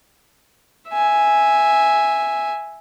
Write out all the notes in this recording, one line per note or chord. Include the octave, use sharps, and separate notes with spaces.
E5 G#5